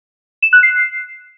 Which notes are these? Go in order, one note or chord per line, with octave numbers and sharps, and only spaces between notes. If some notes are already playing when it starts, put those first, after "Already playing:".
E7
F#6
C7